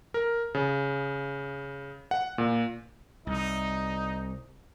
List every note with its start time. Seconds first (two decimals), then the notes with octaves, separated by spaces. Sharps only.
0.14 A#4
0.55 C#3
2.11 F#5
2.38 A#2
3.27 C2 D#4